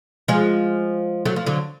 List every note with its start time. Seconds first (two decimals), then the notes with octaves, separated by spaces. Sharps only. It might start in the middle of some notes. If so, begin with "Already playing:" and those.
0.28 F3 G#3
1.25 F#3 A3
1.36 F3
1.46 D3 F#3